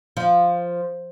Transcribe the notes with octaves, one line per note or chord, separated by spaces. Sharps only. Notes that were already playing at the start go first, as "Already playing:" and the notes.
F3